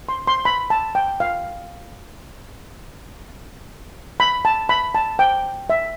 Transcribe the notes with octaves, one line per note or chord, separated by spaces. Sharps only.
C6
C6
B5
A5
G5
F5
B5
A5
B5
A5
G5
E5